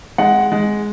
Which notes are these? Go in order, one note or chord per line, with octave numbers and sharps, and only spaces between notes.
G#3 F#5
G#3